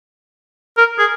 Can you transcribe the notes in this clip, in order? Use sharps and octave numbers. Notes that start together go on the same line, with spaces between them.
A#4
G#4